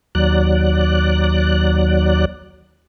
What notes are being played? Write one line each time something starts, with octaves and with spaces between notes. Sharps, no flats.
D#2 F#3 D5 F#6